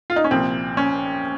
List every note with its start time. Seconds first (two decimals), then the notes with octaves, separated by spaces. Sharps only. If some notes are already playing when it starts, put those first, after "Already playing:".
0.10 F4
0.16 D#4
0.24 C#4
0.31 C2 A#2 F3 C4
0.77 C#4